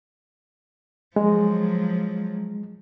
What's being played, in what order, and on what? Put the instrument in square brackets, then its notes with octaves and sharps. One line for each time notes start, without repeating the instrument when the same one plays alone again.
[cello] F3 F#3 [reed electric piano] G#3